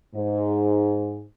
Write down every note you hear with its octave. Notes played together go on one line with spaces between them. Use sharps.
G#2